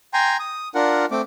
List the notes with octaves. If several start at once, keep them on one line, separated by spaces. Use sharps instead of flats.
G5 G#5 A#5 C6
D#6
D4 F4 A#4 F#5
A3 C4 D6